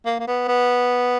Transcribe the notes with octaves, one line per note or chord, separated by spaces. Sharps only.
A#3
A#3
B3
B3